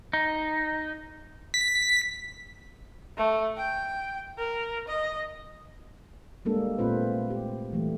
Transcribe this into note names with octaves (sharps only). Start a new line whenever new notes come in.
D#4
B6
A3
G5
A#4
D#5
G3 G#3 A#3 D4 A4
A#2 A3 C4 F4 B4 C5
G4
E3 G3 A3